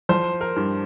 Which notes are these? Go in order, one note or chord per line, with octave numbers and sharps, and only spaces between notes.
F3 C5
A#4
G2